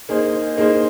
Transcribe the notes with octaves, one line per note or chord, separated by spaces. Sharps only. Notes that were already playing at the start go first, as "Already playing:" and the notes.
A#3 D#4 G#4 C5
A#3 D#4 G#4 C5